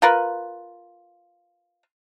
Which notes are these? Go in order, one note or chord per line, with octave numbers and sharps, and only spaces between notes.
F4 A#4 B4